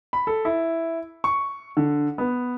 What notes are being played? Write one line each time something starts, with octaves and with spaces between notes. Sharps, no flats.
B5
A4
E4
C#6
D3
B3